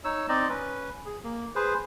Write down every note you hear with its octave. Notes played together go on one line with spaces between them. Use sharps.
D#4 C#5 E6
C4 D#4 D5 D#5
C#4 B4
G#4
A#3
G#4 B4 C5